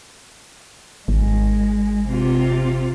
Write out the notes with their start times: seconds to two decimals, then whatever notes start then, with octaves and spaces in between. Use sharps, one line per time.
1.08 G#1 G#3
2.09 C3 F4